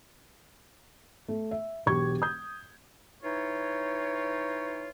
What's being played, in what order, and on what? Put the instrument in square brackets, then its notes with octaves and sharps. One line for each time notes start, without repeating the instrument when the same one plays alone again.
[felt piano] A3
E5
E1 B1 G4 C#6 G#6
D#6 G6
[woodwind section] E3 D#4 F4 C#5